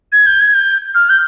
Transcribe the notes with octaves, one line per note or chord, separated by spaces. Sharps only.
G#6
G6
G#6
G6
F6
G6